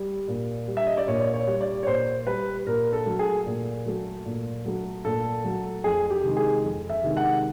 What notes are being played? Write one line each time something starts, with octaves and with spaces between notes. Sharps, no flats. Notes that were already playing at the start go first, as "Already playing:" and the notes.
Already playing: G3
A#2
G3
E5
D#5
D5
A#2 C#5
C#5
G3
D5
C#5
A#2 C5
G3 B4
A#2 A#4
A4
F#3 A3
G#4
A#2
F#3 A3
A#2
F#3 A3
A#2 A4
F#3 A3
F2 G#4
G4
C3 D#3 G#3
G#4
F2
E5
C3 D#3 G#3
F#5